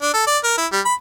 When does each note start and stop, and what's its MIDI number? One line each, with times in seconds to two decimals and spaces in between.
0.02 0.13 62
0.13 0.25 69
0.27 0.38 74
0.43 0.53 70
0.57 0.66 64
0.72 0.80 55
0.85 0.94 83